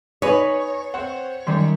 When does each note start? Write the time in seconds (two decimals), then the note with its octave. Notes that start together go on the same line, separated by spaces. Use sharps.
0.22 D#4 B4 C#5 G#5
0.94 C4 C5 F#5
1.47 F#2 D#3 G3 C7